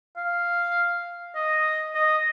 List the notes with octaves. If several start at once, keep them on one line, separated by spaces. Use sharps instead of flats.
F5
D#5
D#5